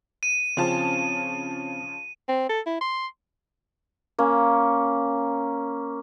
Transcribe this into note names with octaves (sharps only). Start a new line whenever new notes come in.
D#7
C#3 F3 C4 C#4 F4 A5
C4
A4
E4
C6
A#3 C#4